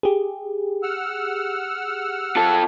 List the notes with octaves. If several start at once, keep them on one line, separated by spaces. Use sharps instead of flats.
G4 G#4
F#5 E6 F6
F4 A4